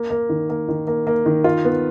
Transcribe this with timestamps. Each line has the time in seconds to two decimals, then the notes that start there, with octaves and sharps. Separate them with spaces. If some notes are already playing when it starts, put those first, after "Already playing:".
Already playing: A#3
0.10 A#3
0.29 D#3
0.50 A#3
0.69 D#3
0.87 A#3
1.07 A#3
1.26 D#3
1.44 F4
1.65 B3